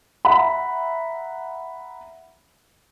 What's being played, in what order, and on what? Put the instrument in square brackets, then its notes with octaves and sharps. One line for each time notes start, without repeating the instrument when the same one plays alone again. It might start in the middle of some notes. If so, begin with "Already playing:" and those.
[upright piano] E5 F#5 A#5 B5